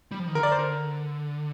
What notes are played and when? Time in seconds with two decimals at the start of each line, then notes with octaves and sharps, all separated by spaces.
0.12 G3
0.19 F3
0.27 D#3
0.35 D3 A#4
0.43 D5
0.52 C5
0.59 A#4